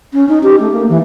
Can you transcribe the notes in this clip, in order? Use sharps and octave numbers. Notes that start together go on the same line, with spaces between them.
C#4
D#4
G4
A3
A#3
E3